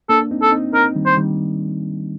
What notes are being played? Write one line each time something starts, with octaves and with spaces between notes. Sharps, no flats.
A#3 D4 A4
C4 D#4
A4
C4 D#4
C4 D#4 A#4
D#3 G3
C5
D#3 G3